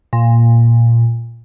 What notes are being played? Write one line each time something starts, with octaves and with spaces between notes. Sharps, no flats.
A#2